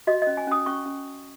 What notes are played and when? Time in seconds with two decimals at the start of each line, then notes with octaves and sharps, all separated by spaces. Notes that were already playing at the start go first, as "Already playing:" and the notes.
0.07 F#4 D#5
0.22 D#5
0.27 C#4
0.37 G#5
0.47 C#4 D#6
0.66 C#4 C#6
0.86 C#4